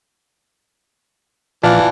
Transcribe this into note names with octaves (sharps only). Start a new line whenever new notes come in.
A#2 E3 F3 F4 D5 F5 A5